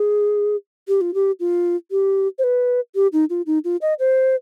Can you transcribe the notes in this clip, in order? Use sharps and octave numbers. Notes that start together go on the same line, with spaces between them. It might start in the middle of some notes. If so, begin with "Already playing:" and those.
Already playing: G#4
G4
F4
G4
F4
G4
C5
B4
G4
D#4
F4
D#4
F4
D#5
C5